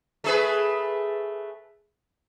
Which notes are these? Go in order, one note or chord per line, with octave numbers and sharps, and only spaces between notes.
A3 G#4 B4